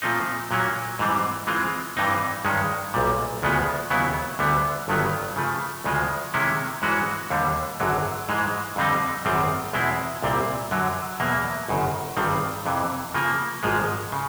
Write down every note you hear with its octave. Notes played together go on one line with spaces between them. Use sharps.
A#2 F3 A3 C4 D#4
A#2 F#3 A#3 C#4
G#2 E3 G3 C4
E3 G#3 C4 F4
G2 E3 G3 C4 D#4
G2 D#3 G#3 C#4
B1 A#2 G3
D2 C#3 F3 G#3 B3
D#2 C#3 F#3 B3 E4
D2 D3 G3 B3
G1 G2 D#3 F#3 B3
C#3 F3 A3
D2 C#3 F3 G#3
C3 D#3 G#3 C#4 E4
G#2 E3 G#3 C#4 F#4
D#2 D3 G3
G#1 F#2 D3 F#3
G#2 E3 G#3
F2 D3 G3 C4 D#4
G#1 F#2 D#3 G3 C4
E2 B2 G#3 C4 E4
C2 A#2 G3 C4
F#2 D3 F#3
E2 B2 F#3 A#3
G1 F#2 C#3
G#1 G2 D#3 G3 C4
F2 C3 E3
C#3 F3 A#3
G#1 G#2 F3 G#3
C#3